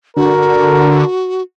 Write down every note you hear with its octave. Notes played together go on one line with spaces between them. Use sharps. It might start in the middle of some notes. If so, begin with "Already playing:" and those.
D3 F#4 A#4